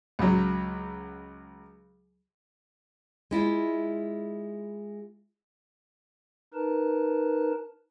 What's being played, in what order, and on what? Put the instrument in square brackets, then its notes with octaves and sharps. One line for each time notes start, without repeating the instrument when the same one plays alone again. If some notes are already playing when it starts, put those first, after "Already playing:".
[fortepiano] C#2 F#3
[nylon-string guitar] G#3 E4 F4
[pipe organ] D#4 A#4 B4 A5